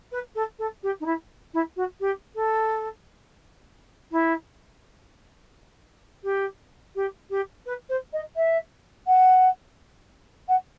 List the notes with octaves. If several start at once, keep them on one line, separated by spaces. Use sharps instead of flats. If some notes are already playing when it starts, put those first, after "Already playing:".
B4
A4
A4
G4
D#4
E4
E4
F#4
G4
A4
E4
G4
G4
G4
B4
C5
D#5
E5
F#5
F#5